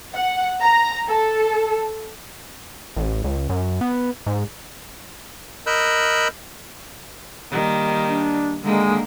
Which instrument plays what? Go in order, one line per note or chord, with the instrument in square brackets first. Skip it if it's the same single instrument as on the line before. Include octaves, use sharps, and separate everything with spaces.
[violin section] F#5
A#5
A4
[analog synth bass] A1
C#2
F#2
B3
G#2
[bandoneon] A#4 D#5 B5 E6 F#6 G6
[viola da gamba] D#3 G3 A#3
[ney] D4
[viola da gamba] D3 D#3 A#3 [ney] G#3